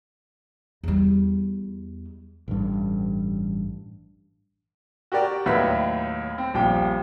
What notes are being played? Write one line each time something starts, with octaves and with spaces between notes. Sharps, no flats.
E2 G3
A1 G2
F#4 G4 A#4 D5
D#2 A2 F#3 B4 E5 B6
C4
D#1 A#1 F3 G4 G5